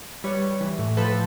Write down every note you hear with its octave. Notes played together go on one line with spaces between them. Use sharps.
G3 B4 C#5
G3
E3
A2
F3 A4 B4